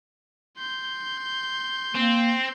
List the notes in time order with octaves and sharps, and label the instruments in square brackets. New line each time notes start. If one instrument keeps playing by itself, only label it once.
[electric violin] C6 G6
[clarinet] A#3 [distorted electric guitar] C4